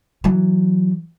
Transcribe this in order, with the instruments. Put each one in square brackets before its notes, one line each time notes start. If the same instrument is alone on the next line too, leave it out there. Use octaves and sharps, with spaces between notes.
[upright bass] E3 F#3